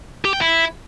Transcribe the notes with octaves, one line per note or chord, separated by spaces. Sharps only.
G4
G5
E4